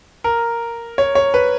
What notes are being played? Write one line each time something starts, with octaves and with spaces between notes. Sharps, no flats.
A#4
C#5
C#5
B4